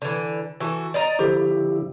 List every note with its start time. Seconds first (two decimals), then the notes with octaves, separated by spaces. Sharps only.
0.02 D3 E3
0.60 E3 F#4 A4
0.94 D5 D#5 A#5
1.19 D3 F3 E4 G4